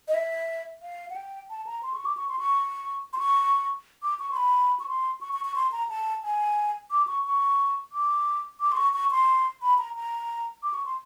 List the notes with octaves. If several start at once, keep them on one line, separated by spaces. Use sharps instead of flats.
D#5
E5
F5
F#5
G5
A5
A#5
C6
C#6
D6
C#6
C6
C#6
C6
C#6
D6
C#6
C6
B5
C#6
C6
C#6
C#6
C#6
C6
A#5
A5
G#5
D6
C#6
C#6
D6
D6
C6
C#6
C#6
C6
B5
A#5
A#5
D6
C#6
C6